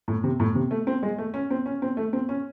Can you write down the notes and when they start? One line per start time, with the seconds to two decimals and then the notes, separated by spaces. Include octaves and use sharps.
0.08 A2
0.24 C3
0.40 A2
0.55 C3
0.71 A3
0.87 C4
1.03 G#3
1.18 A3
1.34 C#4
1.50 C4
1.66 C#4
1.82 C4
1.97 A3
2.13 C4
2.29 C#4